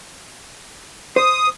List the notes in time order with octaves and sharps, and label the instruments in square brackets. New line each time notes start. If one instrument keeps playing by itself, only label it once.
[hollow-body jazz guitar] C5 [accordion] D#6